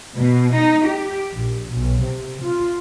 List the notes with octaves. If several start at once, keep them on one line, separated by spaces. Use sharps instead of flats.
B2
D#4
G4
A#1
B1
C3
F4